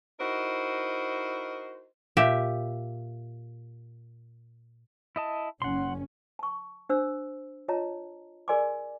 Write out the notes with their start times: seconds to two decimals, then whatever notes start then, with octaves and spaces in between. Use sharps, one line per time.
0.19 D#4 E4 F#4 A#4 C5 D#5
2.17 A#2 G4 E5
5.16 E4 D#5 A5
5.62 F#1 C#4 F#5 C6
6.39 A5 C#6
6.89 D4 C5 E6
7.68 F4 C#5 D#5 A5 A#5
8.48 G#4 A#4 D5 G#5 C6 D6